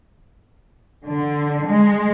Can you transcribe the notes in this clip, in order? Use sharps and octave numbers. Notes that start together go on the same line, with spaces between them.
D3
G#3